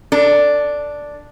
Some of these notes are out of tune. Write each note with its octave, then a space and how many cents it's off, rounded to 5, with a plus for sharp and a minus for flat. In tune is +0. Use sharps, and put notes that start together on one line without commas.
D4 +0 A4 +25